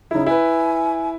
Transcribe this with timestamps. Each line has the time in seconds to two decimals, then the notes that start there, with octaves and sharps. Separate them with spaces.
0.11 C#3 D#4 E4
0.26 E4 B4 G#5